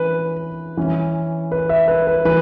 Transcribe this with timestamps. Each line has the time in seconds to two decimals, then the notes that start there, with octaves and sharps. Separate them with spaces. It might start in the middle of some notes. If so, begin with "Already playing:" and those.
Already playing: E3 C#4 B4
0.77 E3 C#4
1.52 B4
1.69 E5
1.88 B4
2.07 B4
2.25 E3 B4